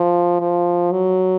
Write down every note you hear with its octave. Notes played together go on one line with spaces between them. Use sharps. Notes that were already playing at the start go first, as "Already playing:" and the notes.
Already playing: F3
F3
F#3